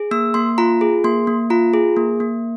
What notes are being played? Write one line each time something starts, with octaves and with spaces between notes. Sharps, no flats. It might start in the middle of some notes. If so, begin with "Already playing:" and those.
Already playing: G#4
A#3 E6
A#3 C6
F4 A#5
G#4
A#3 C6
A#3
F4 A#5
G#4
A#3
A#3